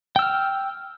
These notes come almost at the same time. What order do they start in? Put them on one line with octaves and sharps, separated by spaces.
G5 E6 F6